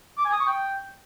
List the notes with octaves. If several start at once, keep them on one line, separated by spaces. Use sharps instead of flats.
D6
G#5
D#6
C#6
G5